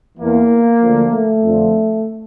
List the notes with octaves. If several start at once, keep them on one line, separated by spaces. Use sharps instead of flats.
E2 E3 A#3
D2 D3 F3
A3
F2 D3 F3